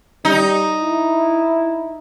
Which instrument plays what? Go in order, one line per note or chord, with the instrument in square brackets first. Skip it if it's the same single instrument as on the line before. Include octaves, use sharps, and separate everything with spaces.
[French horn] G3 [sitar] D#4
[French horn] E4